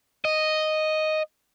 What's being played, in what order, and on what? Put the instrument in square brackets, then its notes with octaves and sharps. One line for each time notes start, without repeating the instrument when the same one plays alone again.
[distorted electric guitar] D#5